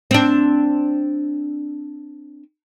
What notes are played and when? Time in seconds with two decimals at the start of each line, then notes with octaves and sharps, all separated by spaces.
0.11 C4 D4